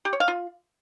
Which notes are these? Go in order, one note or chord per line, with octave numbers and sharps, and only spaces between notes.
G4
C#5
F5
F4